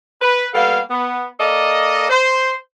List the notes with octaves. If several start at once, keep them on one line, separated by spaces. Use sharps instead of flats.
B4
G3 A#3 B3 A4 F5
B3
A#3 A4 D5 D#5
C5